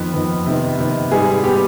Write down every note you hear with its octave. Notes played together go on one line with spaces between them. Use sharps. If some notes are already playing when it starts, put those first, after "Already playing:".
Already playing: F2 D#3 B3 B4
F2 D#3 B3
C3 D#3 B3
C3 D#3 B3
G#2 G3 B3 G#4
G3 B3 G4